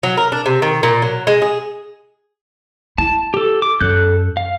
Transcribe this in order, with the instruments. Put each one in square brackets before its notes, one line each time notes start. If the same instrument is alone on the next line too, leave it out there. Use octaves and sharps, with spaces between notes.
[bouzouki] F#3
A#4
D4
C3
D#3
A#2
F#3
G#3
G#4
[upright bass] E4 [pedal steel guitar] A5
[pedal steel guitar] G4 A4
D6
[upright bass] F#2 [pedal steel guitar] A4 F#6 G6
[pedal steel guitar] F5